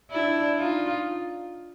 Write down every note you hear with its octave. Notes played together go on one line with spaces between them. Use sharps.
D4 E4
D#4 F4